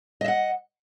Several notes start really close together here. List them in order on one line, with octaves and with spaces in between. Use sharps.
D#5 E5 F#5